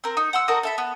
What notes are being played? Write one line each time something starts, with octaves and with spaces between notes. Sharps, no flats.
C4 A#4
D#4
F#5 C6 E6
D#4 F#4 A4 A#4
A4 E5 B5
B3